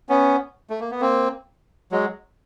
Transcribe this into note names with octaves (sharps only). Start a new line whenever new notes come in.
B3 C#4
A3
A#3
B3
A#3 C4
F#3 G#3